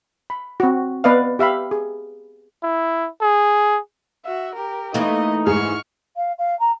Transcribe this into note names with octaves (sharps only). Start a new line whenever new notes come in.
B5
C4 F#4
B3 B4 D5 D#5 F5
G4 E5 F5 B5
G#4
E4
G#4
F#4 E5
G4 A#4
E3 A3 A#3 D#4 D#5
G#2 G#4 C#6 F6
F5
F5
A#5